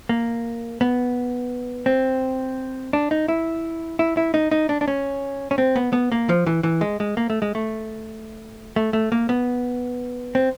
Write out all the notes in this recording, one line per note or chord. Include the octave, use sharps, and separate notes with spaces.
A#3
B3
C4
D4
D#4
E4
E4
E4
D#4
D#4
D4
D4
C#4
C#4
C4
B3
B3
A#3
F3
E3
E3
G#3
G#3
A#3
A3
G#3
A3
A3
A3
A#3
B3
C4